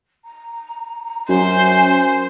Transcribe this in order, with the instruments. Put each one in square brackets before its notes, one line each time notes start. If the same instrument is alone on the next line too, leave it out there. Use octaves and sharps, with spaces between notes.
[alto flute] A#5
[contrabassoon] F#2 [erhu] C5 [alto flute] G#5